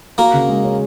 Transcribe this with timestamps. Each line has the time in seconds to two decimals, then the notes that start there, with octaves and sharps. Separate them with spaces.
0.18 A#3 F#4 A#4
0.34 C#3
0.49 G#3
0.64 C#4